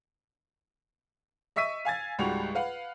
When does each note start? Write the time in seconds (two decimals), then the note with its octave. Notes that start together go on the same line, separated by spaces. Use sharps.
1.56 D#5 E5 C#6 E6 B6 D#7
1.85 F5 G#5 G#6 A6
2.19 C#2 G#2 G3 F#4 C#6 F7
2.55 B4 F5 F#5